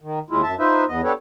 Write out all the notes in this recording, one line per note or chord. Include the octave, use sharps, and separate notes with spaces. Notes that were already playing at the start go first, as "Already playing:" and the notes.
D#3
D#2 G#3 E4 F4
F#2 E5 A5
D#4 F4 B4 C5 E5
E2 B3 D#5
B3 D4 G4 A4 B4 C#5